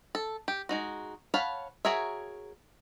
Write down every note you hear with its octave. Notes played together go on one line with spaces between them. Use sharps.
A4
G4
G#3 D#4 F#4
C#5 F5 F#5 A5 B5
F#4 G#4 A#4 C#5 E5